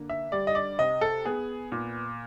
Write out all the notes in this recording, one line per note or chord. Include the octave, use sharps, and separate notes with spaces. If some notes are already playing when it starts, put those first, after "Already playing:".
Already playing: D3 A#3
E5
G3 D5
D#5
D5
C3 D#5
A4
B3 G#4
A#2